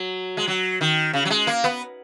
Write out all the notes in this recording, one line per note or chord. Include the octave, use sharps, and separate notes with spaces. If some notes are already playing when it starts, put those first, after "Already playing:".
Already playing: F#3
G#3
F#3
D#3
C#3
F#3
G#3
A#3
B3